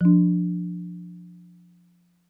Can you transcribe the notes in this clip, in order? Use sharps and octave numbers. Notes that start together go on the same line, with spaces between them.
F3 D4